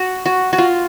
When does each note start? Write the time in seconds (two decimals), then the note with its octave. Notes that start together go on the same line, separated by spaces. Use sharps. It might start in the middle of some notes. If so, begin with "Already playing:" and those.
Already playing: F#4
0.26 F#4
0.53 F#4
0.58 F4